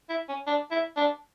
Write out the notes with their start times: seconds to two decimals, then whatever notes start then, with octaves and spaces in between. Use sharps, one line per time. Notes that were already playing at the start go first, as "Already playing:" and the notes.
0.09 E4
0.28 C#4
0.47 D4
0.71 E4
0.97 D4